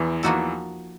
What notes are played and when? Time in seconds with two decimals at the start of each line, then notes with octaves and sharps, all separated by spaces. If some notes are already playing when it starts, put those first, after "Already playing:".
Already playing: E2 E3 F3
0.23 F3 A#3 D#4 F#4 A4